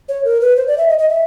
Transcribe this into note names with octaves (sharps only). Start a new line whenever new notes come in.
C#5
A#4
B4
C5
D5
E5
D#5
D#5
E5